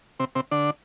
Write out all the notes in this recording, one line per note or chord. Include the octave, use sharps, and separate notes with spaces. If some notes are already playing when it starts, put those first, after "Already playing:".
C3 C4
C3 C4
D3 D4